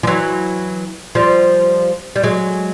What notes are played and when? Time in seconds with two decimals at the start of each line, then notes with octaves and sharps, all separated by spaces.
0.03 F3
0.07 E3 F#3
1.15 F3 G3
2.16 G3
2.23 F#3 G#3